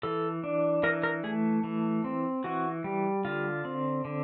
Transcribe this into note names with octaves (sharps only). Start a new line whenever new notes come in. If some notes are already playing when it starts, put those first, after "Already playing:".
E3 A4
D4
E3 A#4
A#4
A3 G#4
E3
C4
E3 F#4
G3
D3 F4
C4
D3